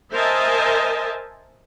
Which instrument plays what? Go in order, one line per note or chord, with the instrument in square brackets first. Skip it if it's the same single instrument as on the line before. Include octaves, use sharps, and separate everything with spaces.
[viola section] A#4 C5 D#5 E5 G#5 A5